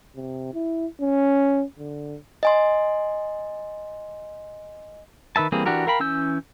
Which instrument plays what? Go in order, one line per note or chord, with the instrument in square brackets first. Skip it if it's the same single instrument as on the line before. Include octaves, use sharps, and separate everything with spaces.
[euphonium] C3
E4
C#4
D3
[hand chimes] D#5 G#5 C6
[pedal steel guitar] D#3 B4 E5 A5
E3 G3 A#3 C4 G#4
E3 D4 F#4 G4 A#4
A#4 F5 G5 B5
E3 C#4 E6 G6